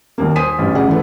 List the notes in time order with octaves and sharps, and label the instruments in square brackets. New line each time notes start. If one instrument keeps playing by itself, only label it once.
[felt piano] D#1 D#2 A#3
C5 G#5 D#6 B6 D#7
A1 G2
F1 C#3 G#4 D5 F#5
E3 A3 B4